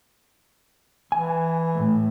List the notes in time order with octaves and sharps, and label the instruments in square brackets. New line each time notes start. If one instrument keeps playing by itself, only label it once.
[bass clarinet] E3 [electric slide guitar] G#5
[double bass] A2